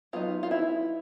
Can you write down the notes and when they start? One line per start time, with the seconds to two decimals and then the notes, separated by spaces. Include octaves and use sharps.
0.13 F#3 B3 D#4 F4
0.43 F4
0.51 E4